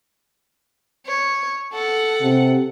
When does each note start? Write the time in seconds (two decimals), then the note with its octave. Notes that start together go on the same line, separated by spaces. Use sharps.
1.07 C#5
1.72 A4 F#5
2.22 C3